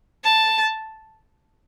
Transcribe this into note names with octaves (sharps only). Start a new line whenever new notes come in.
A5